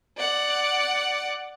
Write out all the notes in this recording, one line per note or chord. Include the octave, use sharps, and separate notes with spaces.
D5 F#5